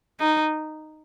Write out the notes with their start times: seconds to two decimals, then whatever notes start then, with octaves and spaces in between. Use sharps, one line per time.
0.20 D#4